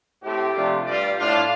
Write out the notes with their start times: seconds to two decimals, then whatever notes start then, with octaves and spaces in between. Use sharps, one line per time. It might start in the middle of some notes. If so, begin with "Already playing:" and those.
0.23 A2 A3 C4 G4
0.54 C3 F3 A3 D4 F4
0.85 G2 G3 F4 D5
1.17 A2 A3 D4 F4 F5